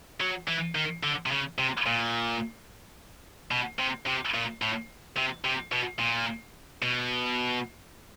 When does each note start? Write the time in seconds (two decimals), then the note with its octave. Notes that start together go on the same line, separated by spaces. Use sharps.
0.20 F#3
0.48 E3
0.75 D#3
1.03 D3
1.26 C3
1.31 C#3
1.58 C3
1.86 A#2
3.51 B2
3.79 C3
4.07 C3
4.34 A#2
4.62 A2
5.17 C3
5.44 C3
5.72 B2
5.99 A#2
6.82 B2